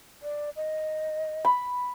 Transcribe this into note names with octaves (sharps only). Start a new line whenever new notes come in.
D5
D#5
B5